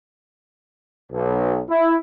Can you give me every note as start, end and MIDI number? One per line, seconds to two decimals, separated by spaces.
1.12 1.60 35
1.69 1.95 64